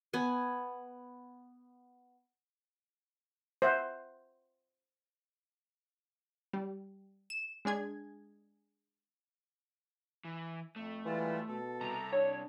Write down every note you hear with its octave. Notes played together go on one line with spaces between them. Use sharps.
B3 G#5
C5 E5 F#5
G3
E7
G#3 D4 G#4 G#6
E3
F2 A3
E3 G3 G#3 F4
B2 A4
C3 G3 A#5
D4 C#5